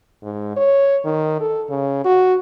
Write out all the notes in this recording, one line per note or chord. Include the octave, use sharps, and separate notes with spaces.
G#2
C#5
D#3
A4
C#3
F#4